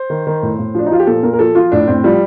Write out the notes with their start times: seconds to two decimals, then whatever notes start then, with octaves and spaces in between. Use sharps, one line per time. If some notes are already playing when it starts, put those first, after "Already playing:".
Already playing: C5
0.10 D#3
0.27 D#3
0.42 A2
0.59 A2
0.75 F3 D4
0.86 D#4
0.91 F3 F4
0.99 G4
1.07 A#2 A4
1.23 A#2 A#4
1.33 A#4
1.39 F3 A4
1.55 F3 F4
1.72 A2 D4
1.87 A2 C4
2.04 F3 G3